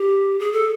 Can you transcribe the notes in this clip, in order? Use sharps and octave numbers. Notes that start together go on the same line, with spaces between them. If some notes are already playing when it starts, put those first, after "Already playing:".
Already playing: G4
G#4
A4